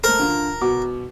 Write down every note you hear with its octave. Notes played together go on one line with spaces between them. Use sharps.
A3 A#4 C5
D3 F4
B2 F#4 D6